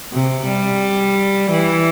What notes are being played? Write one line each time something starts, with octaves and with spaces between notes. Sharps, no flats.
C3
G3
E3